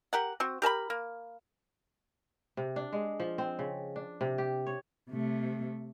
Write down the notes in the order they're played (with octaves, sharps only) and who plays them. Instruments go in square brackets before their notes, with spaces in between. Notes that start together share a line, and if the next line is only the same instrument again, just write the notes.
[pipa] G4 A#4 F#5
C4 F#4
G4 A#4 A5 B5
A#3
[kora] C3
D4
G#3
F3
C4
C#3
D4
C3
G4
C#5
[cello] C3 A3